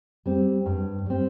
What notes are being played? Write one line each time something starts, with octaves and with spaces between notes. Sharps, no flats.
G3 C4
G2
G3 C4